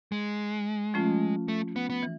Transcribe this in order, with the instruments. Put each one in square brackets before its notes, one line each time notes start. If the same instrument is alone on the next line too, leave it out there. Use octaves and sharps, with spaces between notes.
[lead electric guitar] G#3
[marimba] F3 A3 C#4 F4
[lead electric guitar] A3
B3
B3
[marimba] E3